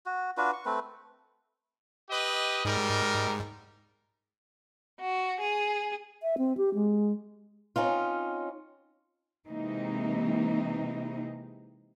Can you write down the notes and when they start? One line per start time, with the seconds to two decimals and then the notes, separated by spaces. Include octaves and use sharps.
0.06 F#4
0.37 D4 F4 F#4 B4
0.53 C#6
0.65 A3 C4 B4
2.10 G4 B4 D#5
2.65 G#2 G3 D#4 A#4
5.01 F#4
5.42 G#4
6.23 E5
6.38 C4
6.57 G4
6.75 G#3
7.76 C4 C#4 D#4 F4
9.48 C3 E3 G#3 A#3 C4 D#4